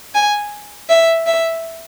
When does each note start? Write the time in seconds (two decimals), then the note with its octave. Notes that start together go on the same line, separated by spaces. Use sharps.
0.14 G#5
0.89 E5
1.27 E5